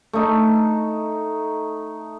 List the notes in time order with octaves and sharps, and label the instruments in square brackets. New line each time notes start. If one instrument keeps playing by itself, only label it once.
[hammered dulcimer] A3 D#4